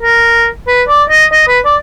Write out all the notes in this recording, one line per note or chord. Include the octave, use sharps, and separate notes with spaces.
A#4
B4
D5
D#5
D#5
B4
D5